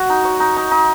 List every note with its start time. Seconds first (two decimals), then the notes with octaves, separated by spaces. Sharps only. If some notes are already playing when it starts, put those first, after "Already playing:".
Already playing: F#4
0.10 D#4
0.25 C#5
0.40 D#4
0.57 D#4
0.71 D#4